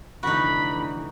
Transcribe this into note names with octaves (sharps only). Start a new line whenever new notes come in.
F1 D3 E3 D#4 F#4 B5